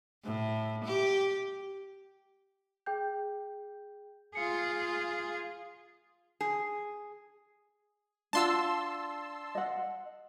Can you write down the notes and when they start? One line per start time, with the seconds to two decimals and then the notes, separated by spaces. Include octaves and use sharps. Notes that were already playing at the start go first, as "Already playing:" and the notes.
0.24 A2
0.84 G4
2.86 G#4 G5 G6
4.35 F4 G#4 C#7
6.41 G#4
8.33 D4 F4 F#5 A5 C6 E6
9.55 D#5 F#5